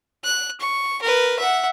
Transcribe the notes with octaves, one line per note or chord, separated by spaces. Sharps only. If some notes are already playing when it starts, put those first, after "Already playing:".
F#6
C#6
A#4 B4
E5 F#5